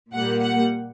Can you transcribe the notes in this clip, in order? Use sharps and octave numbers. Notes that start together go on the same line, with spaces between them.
A#2 G3 A#3 F#5
F#5